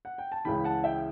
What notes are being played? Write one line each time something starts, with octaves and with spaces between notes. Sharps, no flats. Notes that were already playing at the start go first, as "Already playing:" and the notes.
F#5
G5
A5
C#2 C#3 E3 G5 B5
F#5 A5
E5 G5